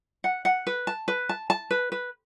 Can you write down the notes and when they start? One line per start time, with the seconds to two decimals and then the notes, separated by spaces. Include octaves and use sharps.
0.24 F#5
0.45 F#5
0.67 B4
0.87 A5
1.08 B4
1.29 A5
1.50 A5
1.71 B4
1.92 B4